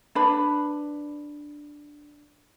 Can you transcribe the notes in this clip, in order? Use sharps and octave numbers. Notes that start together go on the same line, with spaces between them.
D4 B4 B5